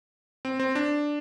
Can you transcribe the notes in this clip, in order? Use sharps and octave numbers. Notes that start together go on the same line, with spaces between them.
C4
C4
D4